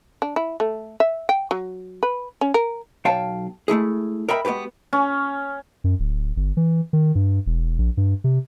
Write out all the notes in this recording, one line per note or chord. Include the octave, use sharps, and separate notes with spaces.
D4
E4
A3
E5
G5
F#3
B4
C#4
A#4
B1 C#5 F5 G5 A5
G#3 A3 E4 G#4
A#4 D#5 E5 G5 B5
G#3 B3 F#4 G4 B4
C#4
F#2
D1
G1
E3
D#3
G2
E1
A#1
G2
C3